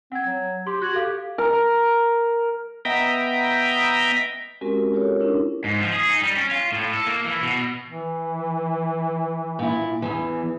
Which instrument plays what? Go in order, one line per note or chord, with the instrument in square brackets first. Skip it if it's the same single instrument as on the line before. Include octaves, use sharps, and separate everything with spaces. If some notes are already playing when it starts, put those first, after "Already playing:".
[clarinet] C4 [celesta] F#5 G#6
[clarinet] F#3
[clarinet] G4 [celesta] C6
[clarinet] F#4 [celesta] F#6 G#6 F#7
[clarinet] G4 [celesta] A4 F5
[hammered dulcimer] A#4
[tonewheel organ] B3 D#5 E5 G5 A#5
[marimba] G#3 C4 C#4 F#4 G4 A#4
F4 G4 A4 A#4 C#5
C#4 D4 E4 A#4
[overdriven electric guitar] G#2
F3
G#4
D#4
G3
C#4
F4
A2
A4
A#3
E3
B2
[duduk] E3
[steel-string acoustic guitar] A#2 E4
E2 G#2 E3